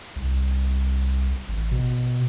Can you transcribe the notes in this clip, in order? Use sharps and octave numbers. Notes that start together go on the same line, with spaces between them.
C2
A1
B2